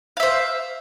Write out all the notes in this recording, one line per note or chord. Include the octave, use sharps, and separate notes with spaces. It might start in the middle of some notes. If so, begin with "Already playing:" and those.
C5 E5 F5